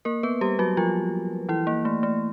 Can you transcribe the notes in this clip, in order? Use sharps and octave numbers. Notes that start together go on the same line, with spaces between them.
A#3 A#4
B3 B4
G3 G4
F#3 F#4
F3 F4
E3 E4
A#3
A3
A3